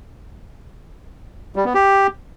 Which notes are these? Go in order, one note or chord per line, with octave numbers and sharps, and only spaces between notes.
G3
B3
G4